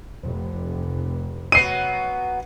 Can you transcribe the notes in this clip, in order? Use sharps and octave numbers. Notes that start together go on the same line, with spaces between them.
F1
F#3 B3 C7 D#7